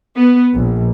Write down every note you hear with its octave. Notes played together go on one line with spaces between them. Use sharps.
B3
A#1